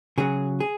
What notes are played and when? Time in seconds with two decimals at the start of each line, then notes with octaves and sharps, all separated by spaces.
0.18 C#3 F#3 G#4
0.60 G#4